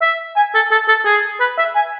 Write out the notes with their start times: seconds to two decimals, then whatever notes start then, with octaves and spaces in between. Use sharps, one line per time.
0.02 E5
0.37 G#5
0.55 A4
0.71 A4
0.88 A4
1.05 G#4
1.40 B4
1.58 E5
1.76 G#5